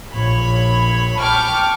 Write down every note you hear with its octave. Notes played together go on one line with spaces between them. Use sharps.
A#1 C#5 B5
G5 A5 C#6 D6 F6